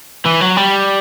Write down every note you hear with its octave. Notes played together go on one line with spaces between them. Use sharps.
E3
F#3
G3